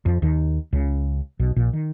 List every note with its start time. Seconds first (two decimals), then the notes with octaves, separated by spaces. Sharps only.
0.06 F2 F3
0.22 D#2 D#3
0.73 C#2 C#3
1.39 B1 B2
1.56 A#1 A#2
1.73 D#3